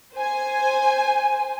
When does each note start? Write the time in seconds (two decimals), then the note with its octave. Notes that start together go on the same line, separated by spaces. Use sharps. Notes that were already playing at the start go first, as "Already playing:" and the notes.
0.14 C5 G#5